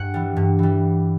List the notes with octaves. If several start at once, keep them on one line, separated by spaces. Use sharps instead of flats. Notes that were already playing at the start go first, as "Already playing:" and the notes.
Already playing: G2 F#5
E3 G3
G2
E3 G3